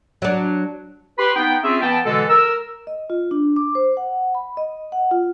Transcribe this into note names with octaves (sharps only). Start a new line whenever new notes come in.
F#3 D4
G4 B4 B5 C6
B3 D#4 G5
C4 C#4 F4 G#4 E5
E3 B3 G5 A5
B2 D3 E3 G#3 A4
A#4 E6
D#5
F4
D4
D6
C5
F#5
B5
D#5
F#5
F4